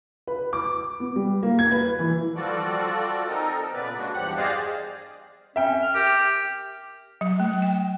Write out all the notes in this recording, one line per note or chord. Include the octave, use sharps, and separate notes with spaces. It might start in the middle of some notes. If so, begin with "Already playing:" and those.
B4
D6
B3
G3
A#3
G#6
B4
E3
F3 G3 F4 F#4 A4 D5
C4 D#4 A4 A#4 D#5
A#2 C#3 B3 B4 D5
G#3 A#3 D4 F#4
E2 G2 F3 G4 F#5 F#6
G4 G#4 C5 D5 D#5 F5
C#4 E5 G5
F6
G4 A#4
F#3
A3
G5